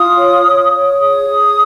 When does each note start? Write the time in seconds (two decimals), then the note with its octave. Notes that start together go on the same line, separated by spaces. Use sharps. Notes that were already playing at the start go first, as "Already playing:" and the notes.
Already playing: F4 D#6
0.17 C#5
0.45 C#5
0.72 C#5
1.00 G#4 D#6
1.28 G#4